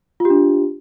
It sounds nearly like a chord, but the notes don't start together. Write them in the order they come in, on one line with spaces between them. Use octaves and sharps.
F4 G4 D4